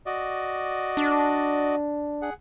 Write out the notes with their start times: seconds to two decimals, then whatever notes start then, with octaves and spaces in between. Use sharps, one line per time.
0.06 F#4 D5 D#5
0.97 D4
2.22 G#4 F#5